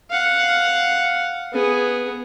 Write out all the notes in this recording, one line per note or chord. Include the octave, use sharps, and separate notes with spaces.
F5 F#5
B3 G#4